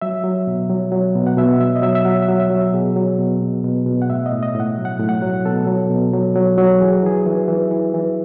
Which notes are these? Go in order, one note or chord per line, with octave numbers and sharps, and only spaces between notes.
F#3 E5
F#3
B2
F#3
F#3
B2
F#5
B2 E5
F#3 E5
D#5
F#3 E5
E5
F#3 F#5
E5
F#3
E5
F#3
F#4
B2 G#4
F#3
B2
B2
B2
B2
F#5
A2 E5
D#5
A2
D#5
A2
F#5
F#3
F#5
A2
F#5
F#3
B2 A4
F#3
B2
F#3
F#3
F#3
E3 G#4
F#4
E3 G#4
E3
E3
E3
E3